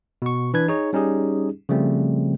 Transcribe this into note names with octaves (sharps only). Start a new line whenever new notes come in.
B2 C#6
E3 D4 B4 G#6
D#4 G#4 C#5
G3 C#4 D#4 G4 G#4
C#3 F3 G3 A3 C4